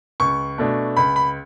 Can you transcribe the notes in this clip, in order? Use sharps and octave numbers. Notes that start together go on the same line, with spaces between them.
C#2 C#6
B2 A3 D4
C#2 B5
B5